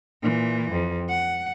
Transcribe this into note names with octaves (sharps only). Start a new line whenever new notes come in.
A#2 E3
F2
F#5